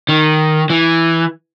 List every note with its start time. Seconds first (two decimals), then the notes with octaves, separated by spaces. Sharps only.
0.09 D#3
0.70 E3